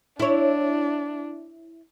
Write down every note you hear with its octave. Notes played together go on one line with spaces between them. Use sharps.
D4 E4 C#5